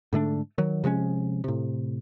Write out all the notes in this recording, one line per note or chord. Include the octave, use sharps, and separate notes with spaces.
G#2 D3 A3 D4
D#3 F#3
C3 F3 G#3 C#4
A2 C3